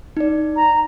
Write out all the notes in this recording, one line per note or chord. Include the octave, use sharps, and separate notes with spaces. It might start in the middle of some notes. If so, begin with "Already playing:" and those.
D#4 D5
A#5